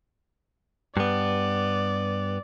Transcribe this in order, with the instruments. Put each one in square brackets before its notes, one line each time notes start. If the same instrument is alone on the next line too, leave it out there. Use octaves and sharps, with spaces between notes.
[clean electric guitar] G2 B3 [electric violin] D5